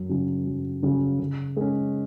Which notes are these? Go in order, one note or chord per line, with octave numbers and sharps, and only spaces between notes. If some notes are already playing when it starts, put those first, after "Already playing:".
Already playing: F#2
C#3 F#3 C#4
F#2
C#3 F#3 C#4
C#3
G#3 C#4